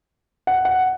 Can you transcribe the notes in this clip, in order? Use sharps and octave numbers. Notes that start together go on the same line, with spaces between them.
F#5
F#5